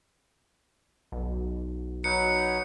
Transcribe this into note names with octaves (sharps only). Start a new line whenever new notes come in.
B1
F#3 D#4 B4 C#7